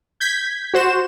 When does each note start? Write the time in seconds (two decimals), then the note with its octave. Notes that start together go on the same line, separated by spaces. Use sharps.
0.20 G6 G#6 B6
0.74 F#4 C5 E7